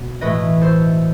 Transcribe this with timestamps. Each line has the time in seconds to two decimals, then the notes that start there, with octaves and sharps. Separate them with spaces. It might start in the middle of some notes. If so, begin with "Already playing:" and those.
Already playing: B2
0.21 A2 E3 A3 B4 D#5
0.61 A4 C5